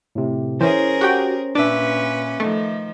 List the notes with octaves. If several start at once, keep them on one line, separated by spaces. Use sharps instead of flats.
A2 C3
E3 C#4 G#4 A#4 C5
F#4 G4 G5
A#2 C#4 D4 B4 E5 D6
D#3 F3 A3